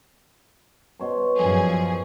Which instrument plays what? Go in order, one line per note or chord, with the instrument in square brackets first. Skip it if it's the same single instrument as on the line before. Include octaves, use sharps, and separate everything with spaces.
[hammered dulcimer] B2 C#5 C6
[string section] F#2 F3 G#4